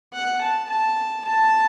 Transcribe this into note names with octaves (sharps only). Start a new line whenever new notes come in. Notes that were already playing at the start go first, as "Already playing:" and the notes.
F#5
A5
A5
A5